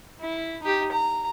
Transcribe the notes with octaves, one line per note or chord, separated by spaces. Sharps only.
E4
D#4 G4
A#5